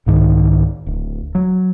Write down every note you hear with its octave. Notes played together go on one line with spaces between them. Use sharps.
C2 G#2 D#3
D1
F#3